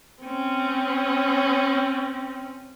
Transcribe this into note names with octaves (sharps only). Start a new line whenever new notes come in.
C4 C#4